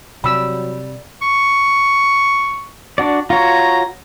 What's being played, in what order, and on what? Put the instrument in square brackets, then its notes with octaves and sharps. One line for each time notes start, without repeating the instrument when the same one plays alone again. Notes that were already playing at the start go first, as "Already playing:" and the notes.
[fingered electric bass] C3 [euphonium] F#3 [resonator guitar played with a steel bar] G3 [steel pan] B5 E6
[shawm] C#6
[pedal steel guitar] D4 F#4 D5
[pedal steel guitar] F4 F#4 C#5 [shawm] A#5